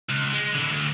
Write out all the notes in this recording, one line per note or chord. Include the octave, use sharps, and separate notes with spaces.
C#2
G#3
A2 D3
D2